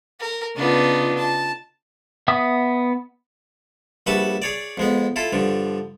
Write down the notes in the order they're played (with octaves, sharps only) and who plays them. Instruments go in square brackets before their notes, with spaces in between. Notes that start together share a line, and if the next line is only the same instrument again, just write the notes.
[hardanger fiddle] A#4
[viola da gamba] C#3 D#4 F4 [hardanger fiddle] B3 D4
[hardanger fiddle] A5
[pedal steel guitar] B3 E5 F#5 D#6
[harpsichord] A#1 G3 F#4 B4 E5 A5
G#4 C#5 D5
F2 G#3 B3
E4 F4 A4
G2 D3 F3